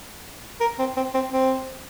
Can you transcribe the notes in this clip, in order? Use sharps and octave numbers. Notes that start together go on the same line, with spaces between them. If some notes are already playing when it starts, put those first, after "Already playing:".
A#4
C4
C4
C4
C4